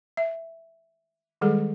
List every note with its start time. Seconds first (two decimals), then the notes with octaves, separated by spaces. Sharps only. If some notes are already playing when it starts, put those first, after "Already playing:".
0.17 E5
1.41 D#3 G3 G#3 G#4 A4